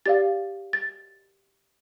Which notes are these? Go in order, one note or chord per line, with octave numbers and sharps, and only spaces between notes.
G4 D5 F5 A6
A6